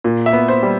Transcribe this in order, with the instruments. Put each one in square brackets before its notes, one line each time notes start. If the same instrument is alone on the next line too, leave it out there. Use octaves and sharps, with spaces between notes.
[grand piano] A#2
E5
B3
C5
G3